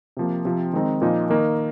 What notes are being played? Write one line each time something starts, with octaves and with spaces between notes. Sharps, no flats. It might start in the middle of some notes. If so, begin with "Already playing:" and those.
C3 F3 A#3
C3 F3 C4
D#3 G#3 C4 D#4
A#2 F3 A#3 D#4
D#3 A#3 D#4